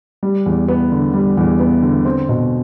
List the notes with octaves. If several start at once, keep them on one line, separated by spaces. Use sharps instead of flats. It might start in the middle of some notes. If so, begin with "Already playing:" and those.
G3
E2
B3
D3
G3
E2
B3
D3
C4
B2